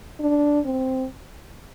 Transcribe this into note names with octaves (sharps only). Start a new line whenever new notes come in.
D4
C4